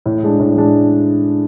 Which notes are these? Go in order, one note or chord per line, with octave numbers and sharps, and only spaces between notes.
A2
G#3 D4
A2
G#3 D4